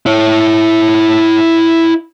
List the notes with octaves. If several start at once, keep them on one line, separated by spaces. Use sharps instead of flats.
E4 C#5